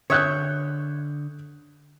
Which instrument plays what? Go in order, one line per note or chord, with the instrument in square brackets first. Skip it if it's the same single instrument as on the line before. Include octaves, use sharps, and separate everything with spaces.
[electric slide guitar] D3 [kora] C#5 E5 [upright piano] D#6 F#6 G6